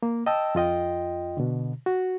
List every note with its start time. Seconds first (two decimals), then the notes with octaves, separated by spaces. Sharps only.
0.03 A#3
0.26 D#5 G5 A5 E6
0.55 F2 F4 D#5 G5
1.37 B2 D3
1.86 F#4